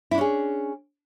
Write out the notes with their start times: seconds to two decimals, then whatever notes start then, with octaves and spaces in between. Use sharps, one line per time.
0.11 E4
0.15 D4
0.18 C#4
0.21 G#4